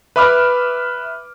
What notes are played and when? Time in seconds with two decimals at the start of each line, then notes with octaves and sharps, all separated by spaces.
0.16 B4 E5 B5 D6 F6